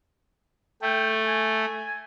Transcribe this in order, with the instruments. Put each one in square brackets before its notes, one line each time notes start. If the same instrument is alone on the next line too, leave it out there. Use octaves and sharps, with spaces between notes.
[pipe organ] A3 [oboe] G5
[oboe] G#5